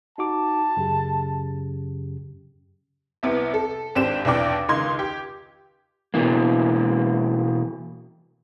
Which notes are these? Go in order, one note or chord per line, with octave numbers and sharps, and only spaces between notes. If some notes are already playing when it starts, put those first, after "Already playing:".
D#4 F#4 A5 D6
F#2 C#3 G4
C2 C3 B3 E4
A4
G#1 C4 D4 G4 E7
B1 E2 D4 G5 D6
C#2 D#3 D#5 C6 G#6
G4
B2 E3 A#3